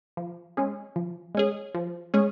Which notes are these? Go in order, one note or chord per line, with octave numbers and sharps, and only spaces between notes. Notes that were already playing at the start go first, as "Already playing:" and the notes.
F3
G#3 C#4 G#4
F3
G#3 C#4 G#4
F3
G#3 C#4 G#4